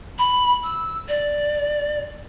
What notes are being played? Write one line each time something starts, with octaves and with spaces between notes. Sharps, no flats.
B5
E6
D5